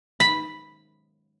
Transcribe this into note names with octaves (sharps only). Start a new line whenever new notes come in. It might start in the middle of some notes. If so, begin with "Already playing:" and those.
B5